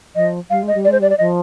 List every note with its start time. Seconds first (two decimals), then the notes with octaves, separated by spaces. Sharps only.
0.15 F3 D#5
0.50 G3 F5
0.63 G#3 D#5
0.74 G3
0.84 D5
0.88 G#3 C5
1.00 G3 D5
1.10 D5
1.18 F3 D#5